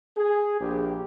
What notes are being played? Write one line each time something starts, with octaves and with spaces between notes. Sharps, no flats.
G#4
A#1 G4